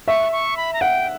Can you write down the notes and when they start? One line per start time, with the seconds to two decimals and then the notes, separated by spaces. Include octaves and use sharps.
0.08 E5 C#6
0.32 C#6
0.57 B5
0.73 A#5
0.81 F#5 G5